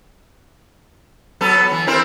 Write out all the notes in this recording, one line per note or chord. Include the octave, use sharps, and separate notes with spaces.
F#3 B3 A4
E3
C4 E4 A#4